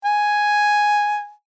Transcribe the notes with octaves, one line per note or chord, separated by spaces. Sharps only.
G#5